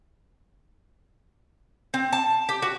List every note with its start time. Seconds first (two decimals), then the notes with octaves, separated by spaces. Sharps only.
1.94 C4
2.13 A5
2.49 G4
2.62 F#4